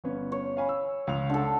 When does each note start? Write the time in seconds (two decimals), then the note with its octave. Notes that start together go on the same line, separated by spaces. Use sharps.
0.04 G1 B3 C#4
0.32 C#5
0.57 F5 G#5 B5
0.69 E6
1.07 C#2 F7
1.30 D3 A4